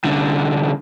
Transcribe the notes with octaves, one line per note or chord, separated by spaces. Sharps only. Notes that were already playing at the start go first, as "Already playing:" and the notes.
C2 D3